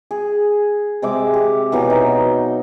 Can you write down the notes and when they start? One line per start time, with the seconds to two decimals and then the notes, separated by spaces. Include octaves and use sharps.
0.11 G#4
1.02 C3 G#3 E5 D6
1.34 G4
1.72 B2 E3 F#3
1.90 D#4